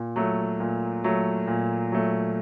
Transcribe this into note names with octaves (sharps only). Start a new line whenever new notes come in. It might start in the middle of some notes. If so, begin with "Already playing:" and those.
Already playing: A#2
F#3 A3
A#2
F#3 A3
A#2
F#3 A3